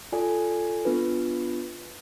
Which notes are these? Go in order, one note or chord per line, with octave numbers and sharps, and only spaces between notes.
F4 A4 D5 G#5
B3 D4 F4 B4